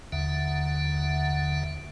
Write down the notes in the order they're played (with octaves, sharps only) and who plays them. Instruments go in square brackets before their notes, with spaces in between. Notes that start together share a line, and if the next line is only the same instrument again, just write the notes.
[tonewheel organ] D#2 D3 E5 F#5